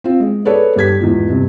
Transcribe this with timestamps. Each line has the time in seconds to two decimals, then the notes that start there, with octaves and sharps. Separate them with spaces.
0.04 C4 F4
0.20 G#3
0.45 G#4 A4 B4 C#5 D5
0.76 G2 G4 G#6 B6
1.00 E2 G#2 F3
1.29 G2 C3